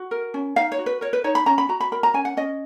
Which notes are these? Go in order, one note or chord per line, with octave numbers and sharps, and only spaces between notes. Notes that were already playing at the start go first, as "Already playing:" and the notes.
Already playing: F#4
A#4
C#4
D#4 F5
C#5
F#4
B4
A#4 C#5
B4
D#4 C#5
B5
C#4 A#5
B5
F#4 A#5
B5
A#4 B5
A#5
C#4 G#5
F#5
C#4 D#5